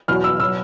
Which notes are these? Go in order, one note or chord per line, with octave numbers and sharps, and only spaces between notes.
E2 B2 F#3 F6
E6
B2 F#3 E6